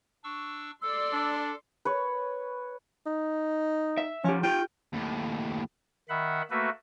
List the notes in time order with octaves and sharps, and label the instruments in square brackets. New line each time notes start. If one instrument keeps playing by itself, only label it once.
[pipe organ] D4 C#6 E6
[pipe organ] A4 [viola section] D5 C6 [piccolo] E6
[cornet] D4
[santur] B4 C#5
[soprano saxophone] D#4
[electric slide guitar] E5
[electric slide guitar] F3 G4 [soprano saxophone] C#4
[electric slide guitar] F4 G4 [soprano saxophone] G5
[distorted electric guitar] D#2 A2
[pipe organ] D#3 E5 F#5 B5
A3 A#3 F#4 B4 E5